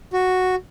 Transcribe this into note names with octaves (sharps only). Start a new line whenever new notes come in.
F#4